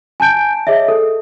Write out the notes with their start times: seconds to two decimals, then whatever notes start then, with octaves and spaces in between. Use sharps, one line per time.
0.20 G#5 A5 G6 D7
0.67 G#4 C#5 D#5 E5
0.88 A4